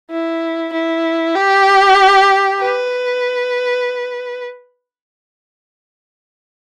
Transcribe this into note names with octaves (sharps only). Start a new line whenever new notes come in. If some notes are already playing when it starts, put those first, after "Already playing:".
E4
E4
G4
B4